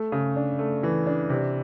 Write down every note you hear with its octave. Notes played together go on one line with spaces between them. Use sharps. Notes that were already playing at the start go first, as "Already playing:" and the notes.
Already playing: A3
C#3
D4
A3
E3
D4
C3